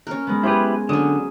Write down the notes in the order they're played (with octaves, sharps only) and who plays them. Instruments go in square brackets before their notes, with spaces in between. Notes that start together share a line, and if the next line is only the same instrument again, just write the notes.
[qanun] C#4 A#4 [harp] F#6
[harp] G#3 B3
[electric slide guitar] E4 G4 B4 [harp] G#4 C5
[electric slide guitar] D3 [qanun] F#3 C#4 [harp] D#6 E7